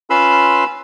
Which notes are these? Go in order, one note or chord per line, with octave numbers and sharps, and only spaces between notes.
C#4 F4 B4 B5 C6 E6